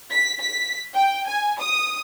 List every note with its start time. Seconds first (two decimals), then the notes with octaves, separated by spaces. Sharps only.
0.11 B6
0.40 B6
0.95 G5
1.28 G#5
1.59 D#6